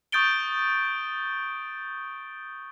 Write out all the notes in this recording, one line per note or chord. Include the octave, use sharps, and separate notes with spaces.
C#6 D#6 G6 A6 D7 G7